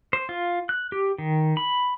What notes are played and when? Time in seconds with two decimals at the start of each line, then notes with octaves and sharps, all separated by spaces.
0.13 C5
0.29 F4
0.69 F#6
0.92 G4
1.18 D#3
1.57 B5